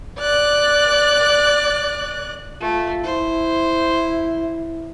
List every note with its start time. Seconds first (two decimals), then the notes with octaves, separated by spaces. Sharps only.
0.19 D5 F#6
2.61 A3 F4
3.04 E4 C5